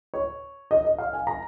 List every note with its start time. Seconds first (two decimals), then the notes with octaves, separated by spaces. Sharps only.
0.14 C#5
0.71 D#5
0.85 D#5
0.98 F5
1.13 G#5
1.27 A#5